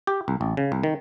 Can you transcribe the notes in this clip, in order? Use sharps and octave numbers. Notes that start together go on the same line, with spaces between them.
G4
C2
A1
C#3
C2
D#3